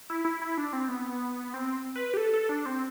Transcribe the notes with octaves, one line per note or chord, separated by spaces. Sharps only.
E4
E4
E4
D4
C4
B3
C4
B4
G4
A4
A4
D4
C4